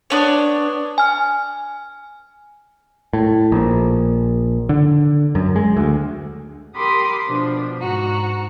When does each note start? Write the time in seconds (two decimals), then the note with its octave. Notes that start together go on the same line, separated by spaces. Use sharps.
0.10 B3 D4 C#5
0.98 G#5 F6
3.13 A2
3.52 A#1
4.69 D3
5.35 F#2
5.56 G#3
5.77 D2
6.76 G4 A#4 B5 C6 D6 D#6
7.28 B2 F3 D4
7.81 G#2 F#4 A#5